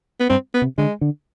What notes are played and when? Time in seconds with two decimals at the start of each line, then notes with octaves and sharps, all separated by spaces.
0.20 B3
0.29 G2 C4
0.54 B3
0.62 C3
0.78 D3 G#3
1.01 D3